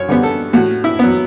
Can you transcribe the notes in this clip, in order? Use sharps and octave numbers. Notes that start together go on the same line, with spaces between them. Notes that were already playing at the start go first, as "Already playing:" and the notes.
Already playing: F#2 C#5
D3 G3 B3
A4
A2 F#4
E4
F#3 B3